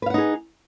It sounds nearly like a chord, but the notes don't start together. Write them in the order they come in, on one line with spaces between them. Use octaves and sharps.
B4 F5 F#5 D#4 G#4